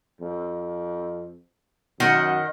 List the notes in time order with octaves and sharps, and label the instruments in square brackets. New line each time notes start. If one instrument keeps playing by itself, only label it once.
[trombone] F2
[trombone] F#2 [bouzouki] D#3 D#5 F#5